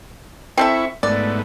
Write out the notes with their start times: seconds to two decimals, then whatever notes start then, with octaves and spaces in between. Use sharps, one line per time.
0.58 C4 E4 A4 E5 C#6
1.03 G#2 A3 B3 D5